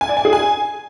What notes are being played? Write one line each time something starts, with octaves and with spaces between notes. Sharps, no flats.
G#5
D5
G#5
G#4
G#5